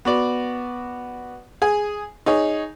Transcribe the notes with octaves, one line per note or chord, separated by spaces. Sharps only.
B3 F#4 D5
G#4 G#5
D#4 G#4 C#5